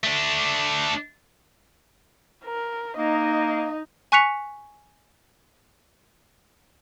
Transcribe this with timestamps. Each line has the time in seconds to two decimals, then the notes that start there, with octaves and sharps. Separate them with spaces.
0.04 A3 D4
2.45 A#4
2.97 A#3 D#4 D#5
4.12 G#5 C#6 F#6 B6 C#7 F7